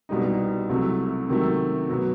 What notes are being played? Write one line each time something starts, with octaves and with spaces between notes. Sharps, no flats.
C2 B2 G3 D#4
C2 C3 F#3 A3
C3 D#3 F#3 A3
B2 F#3 B3